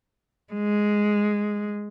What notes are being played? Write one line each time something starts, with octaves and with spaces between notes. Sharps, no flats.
G#3